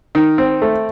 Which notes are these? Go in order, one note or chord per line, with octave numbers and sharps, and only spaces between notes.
D#3
C4
A3